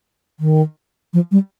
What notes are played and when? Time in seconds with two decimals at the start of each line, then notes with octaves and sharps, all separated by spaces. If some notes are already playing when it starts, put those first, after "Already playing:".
0.40 D#3
1.14 F3
1.32 G3